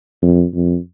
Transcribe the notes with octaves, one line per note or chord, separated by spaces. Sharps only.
F2
F2